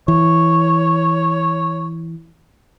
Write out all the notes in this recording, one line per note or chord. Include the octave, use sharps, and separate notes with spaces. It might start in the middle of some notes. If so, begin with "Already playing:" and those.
E3 C#5